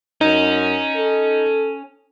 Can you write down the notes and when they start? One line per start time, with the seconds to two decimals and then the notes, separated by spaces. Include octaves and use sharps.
0.21 F#2 C#4 D#4
0.96 A4